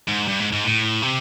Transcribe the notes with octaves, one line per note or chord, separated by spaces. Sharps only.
G#2
G2
G#2
G#2
A2
C3